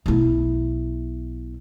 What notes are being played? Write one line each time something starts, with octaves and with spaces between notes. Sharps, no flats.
B1 E4